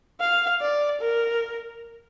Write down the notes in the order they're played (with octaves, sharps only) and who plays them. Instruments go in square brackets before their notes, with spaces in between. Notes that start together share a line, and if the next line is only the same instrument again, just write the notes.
[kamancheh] F5
D5
A#4